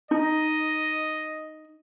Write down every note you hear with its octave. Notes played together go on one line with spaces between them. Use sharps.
D#4 D#5